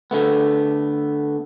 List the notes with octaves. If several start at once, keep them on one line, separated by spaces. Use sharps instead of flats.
D3 A3 B3